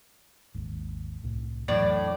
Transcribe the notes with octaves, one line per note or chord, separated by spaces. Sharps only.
G#1 D#2
C2 A2
F2 A2 E3 F#3 D4 D5